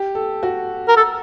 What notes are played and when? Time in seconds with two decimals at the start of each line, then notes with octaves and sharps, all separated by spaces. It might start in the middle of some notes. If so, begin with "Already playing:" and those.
Already playing: G4
0.15 A4
0.43 F#4
0.88 A#4
0.96 A4